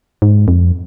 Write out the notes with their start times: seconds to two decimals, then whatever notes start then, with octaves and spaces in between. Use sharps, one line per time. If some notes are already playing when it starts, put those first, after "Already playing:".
0.22 G#2
0.48 F2